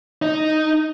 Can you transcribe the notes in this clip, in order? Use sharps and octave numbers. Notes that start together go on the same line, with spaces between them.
D#4